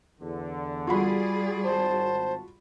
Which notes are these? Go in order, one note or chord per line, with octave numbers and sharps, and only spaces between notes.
E2 D3
G3 F4 F#4 G#4 D5 B5
G#1 C5 A5